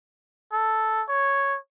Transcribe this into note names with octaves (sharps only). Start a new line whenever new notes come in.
A4
C#5